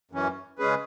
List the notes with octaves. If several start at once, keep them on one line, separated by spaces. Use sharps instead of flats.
F#2 E3 C#4
C#3 G#3 C#4 G#4 B4